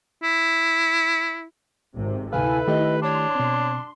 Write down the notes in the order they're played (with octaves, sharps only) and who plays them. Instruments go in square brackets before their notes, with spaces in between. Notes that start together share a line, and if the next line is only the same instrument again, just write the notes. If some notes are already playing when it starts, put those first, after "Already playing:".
[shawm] E4
[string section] G#1 C3
[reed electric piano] D2 C3 F5 [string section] E4 A4 [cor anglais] B4 [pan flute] G#5
[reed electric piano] D#3 A3 G4 [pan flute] D#5
[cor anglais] D4 [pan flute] C#5 [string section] C6
[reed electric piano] B2 C4